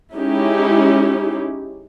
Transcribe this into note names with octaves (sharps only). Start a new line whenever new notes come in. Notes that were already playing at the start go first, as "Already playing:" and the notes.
G#3 C#4 D#4 E4 G4